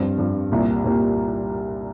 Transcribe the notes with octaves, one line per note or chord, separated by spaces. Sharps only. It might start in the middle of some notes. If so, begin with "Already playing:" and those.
Already playing: G2 F3 C4
G2 F3 C4
C2 A#2 G3 A#3
C2 A#2 G3 A#3